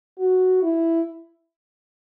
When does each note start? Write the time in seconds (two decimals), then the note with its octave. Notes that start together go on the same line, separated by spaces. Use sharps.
0.18 F#4
0.62 E4